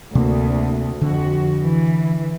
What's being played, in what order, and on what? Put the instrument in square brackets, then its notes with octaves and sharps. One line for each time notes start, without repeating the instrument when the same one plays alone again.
[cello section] D2 [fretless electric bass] C3 A#3
[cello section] F2 F#4 [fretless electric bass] D3
[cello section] E3